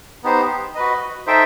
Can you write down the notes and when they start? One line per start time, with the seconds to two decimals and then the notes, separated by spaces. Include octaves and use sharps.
0.23 B3 D#4 G4 C5
0.75 F#4 B4 D#5
1.27 D#4 A4 C5 E5 G5